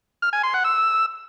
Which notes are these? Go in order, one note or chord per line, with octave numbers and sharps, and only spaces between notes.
F6
G#5
C6
F#5
E6